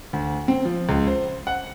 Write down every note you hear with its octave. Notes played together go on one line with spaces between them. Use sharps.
D2
C4
F3
C#2
C5
F#5